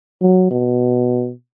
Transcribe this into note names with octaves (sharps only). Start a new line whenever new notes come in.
F#3
B2